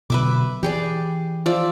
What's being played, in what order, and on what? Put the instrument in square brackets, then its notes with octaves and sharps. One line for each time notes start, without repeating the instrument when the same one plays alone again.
[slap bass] B2 D3 F#3 [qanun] B4 E5 D6
[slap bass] E3 [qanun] G4 G#4 D5
[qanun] F3 D5 E5